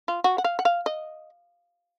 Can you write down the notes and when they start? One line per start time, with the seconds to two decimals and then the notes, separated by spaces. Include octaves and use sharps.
0.08 F4
0.24 F#4
0.38 F#5
0.44 F5
0.59 F#5
0.65 F5
0.86 D#5